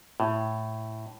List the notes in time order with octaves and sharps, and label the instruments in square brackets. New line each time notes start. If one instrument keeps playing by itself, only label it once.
[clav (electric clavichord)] A2